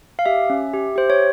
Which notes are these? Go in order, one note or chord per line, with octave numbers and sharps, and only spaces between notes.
F5
G4 E5
C#4
G4
G4 C5
C#5